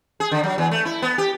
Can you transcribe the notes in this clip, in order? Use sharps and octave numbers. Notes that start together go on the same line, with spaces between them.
G#4
D3
F#3
E2
A3
E4
B3
G4